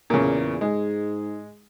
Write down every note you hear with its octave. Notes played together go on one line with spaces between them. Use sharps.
E2 A#2 C#3
G#2 G#3